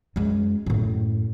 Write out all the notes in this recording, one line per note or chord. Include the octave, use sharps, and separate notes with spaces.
F#2 G#3
F#2 A2